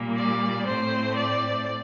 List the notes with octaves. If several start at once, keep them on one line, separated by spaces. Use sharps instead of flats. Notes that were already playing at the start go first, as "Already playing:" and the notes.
Already playing: A#2 G3 A#3
D5
A2 A3 C4 C5
D5